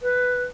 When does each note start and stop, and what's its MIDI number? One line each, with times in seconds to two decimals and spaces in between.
0.02 0.43 71